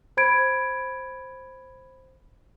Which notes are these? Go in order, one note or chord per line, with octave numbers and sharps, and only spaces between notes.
C5 B5 G#6 D7